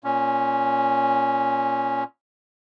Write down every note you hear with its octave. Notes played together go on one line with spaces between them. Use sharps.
A#2 C#4